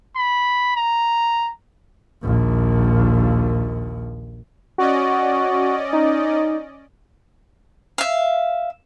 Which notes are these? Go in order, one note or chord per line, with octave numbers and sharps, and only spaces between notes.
B5
A#5
A#1 D#2
C#4 F#4 D5 D#5
D#4
E5 F5